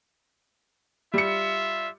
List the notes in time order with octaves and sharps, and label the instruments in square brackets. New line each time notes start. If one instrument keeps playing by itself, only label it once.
[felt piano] G3 C#7 [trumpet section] F4 E5